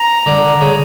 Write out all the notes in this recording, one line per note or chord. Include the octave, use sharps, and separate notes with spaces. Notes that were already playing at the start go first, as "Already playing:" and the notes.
Already playing: A#5
D3
C#3